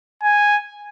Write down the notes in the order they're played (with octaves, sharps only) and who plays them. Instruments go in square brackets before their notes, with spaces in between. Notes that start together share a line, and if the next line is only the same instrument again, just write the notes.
[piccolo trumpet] G#5